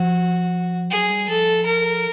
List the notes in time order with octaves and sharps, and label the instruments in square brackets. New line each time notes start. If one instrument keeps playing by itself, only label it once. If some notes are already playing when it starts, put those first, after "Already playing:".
Already playing: [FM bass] F3 [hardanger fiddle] F#4
[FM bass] F#3 [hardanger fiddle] G#4
[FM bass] G3
[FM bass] F3 [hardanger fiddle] A4
[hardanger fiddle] A#4